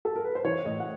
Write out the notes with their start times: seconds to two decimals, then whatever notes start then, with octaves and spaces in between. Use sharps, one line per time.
0.05 A4
0.16 A#4
0.24 B4
0.35 C5
0.45 E3 C#5
0.65 A2 D#5
0.80 F#5